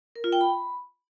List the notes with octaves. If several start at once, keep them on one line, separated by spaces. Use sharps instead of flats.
A#4
F4
G5
B5